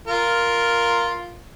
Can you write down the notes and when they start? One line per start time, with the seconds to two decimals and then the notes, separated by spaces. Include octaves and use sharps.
0.08 F4 A#4